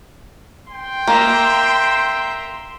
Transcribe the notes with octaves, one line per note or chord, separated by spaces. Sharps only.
G5 C6
A#3 E5 A#5